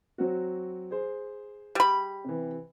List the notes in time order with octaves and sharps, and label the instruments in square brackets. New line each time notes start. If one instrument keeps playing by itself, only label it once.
[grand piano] F#3 C4 F#4
G#4 C5
[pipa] G3 B5
[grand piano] C3 E3